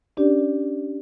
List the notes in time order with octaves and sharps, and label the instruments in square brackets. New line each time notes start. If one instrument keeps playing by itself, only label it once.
[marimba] C#4 D4 G4 D5